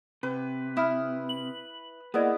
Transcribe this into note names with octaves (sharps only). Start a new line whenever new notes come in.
C3 B4
E4 D#6 F6
F#7
A#3 B3 E4 G#4 D5 D#5